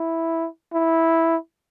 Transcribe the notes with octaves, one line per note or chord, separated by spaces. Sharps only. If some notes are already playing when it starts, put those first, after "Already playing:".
Already playing: E4
E4